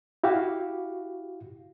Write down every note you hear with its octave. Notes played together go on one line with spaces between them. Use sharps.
E4 F#4 G4 F5